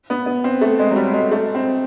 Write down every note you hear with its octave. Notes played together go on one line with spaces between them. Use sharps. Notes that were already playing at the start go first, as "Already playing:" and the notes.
B3
B3
C4
A3
G#3
F#3
G3
G#3
A3
C4